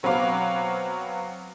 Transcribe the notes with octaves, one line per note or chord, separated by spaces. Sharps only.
B2 F#3 C4 B4 F5 D6